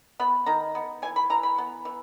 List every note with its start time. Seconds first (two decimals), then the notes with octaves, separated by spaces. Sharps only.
0.20 B3 B5
0.46 D#3 A#5
0.75 B3
1.02 E3 G#5
1.16 B5
1.30 E3 A#5
1.43 B5
1.58 B3
1.85 E3